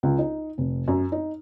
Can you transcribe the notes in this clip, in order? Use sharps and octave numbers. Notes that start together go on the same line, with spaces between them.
C#2
D#4
F1
F#2
D#4